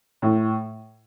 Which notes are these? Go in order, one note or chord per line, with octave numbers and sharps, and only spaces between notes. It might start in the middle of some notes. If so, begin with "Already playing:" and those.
A2